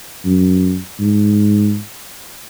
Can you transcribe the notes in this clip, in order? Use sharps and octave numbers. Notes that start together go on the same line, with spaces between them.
F#2
G#2